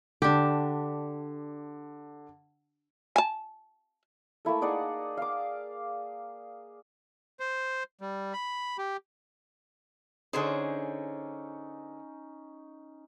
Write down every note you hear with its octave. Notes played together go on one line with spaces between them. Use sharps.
D3 D4 G4
G#5 A5
A3 A#3 E4 A4
D#4 G#4 D5 F#5
F5 D6
C5
G3
B5
G4
D3 C#4 D#4 G#4 C5